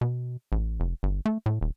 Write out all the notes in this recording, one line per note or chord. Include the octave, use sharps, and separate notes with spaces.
B2
A1
F1
G1
A3
A2
D#1